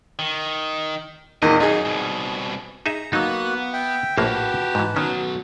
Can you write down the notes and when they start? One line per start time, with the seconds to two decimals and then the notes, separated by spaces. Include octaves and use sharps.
0.19 D#3
1.42 E2 A#2 D#3 D#5
1.60 F#2 D#4 G#4
1.85 C2 B2
2.86 D#4 G#4 E5 A#5
3.13 F#3 A#3 B3 D#4 F#4 F#6
3.73 E5 G5
4.18 A#1 A2 A#3 F#4 G4 B4 A5
4.75 G#2 E3
4.96 B1 D#3 F#3 C#4